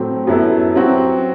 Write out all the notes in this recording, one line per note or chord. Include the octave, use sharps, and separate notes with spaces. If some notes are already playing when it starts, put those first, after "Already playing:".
Already playing: A2 F#3 A3 C4
F#2 F#3 B3 E4 A4
F#3 C4 F#4